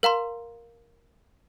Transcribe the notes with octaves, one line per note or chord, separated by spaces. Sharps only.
A#4 F5 A#5 C6